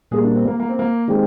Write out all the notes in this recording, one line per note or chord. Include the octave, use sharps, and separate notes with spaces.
A#2 G3 A#3 G#4
D4
C4
A#3
A#3
C4
A#3
D#3 G#3 C4 G4